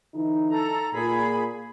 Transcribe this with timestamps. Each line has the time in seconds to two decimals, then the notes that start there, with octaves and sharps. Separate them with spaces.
0.14 D3 E3 D#4
0.50 A4 A#5
0.92 A#2 G#4 B5